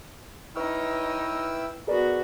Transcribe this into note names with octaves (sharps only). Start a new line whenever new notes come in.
D#4 E4 B4 C#5 G5 C#6 E6 F6
B3 F#4 G#4 A#4 D5